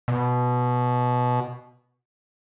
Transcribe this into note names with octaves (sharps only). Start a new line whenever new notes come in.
B2